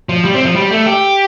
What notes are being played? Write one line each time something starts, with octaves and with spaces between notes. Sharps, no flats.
F3
G3
C4
F3
G3
A3
G4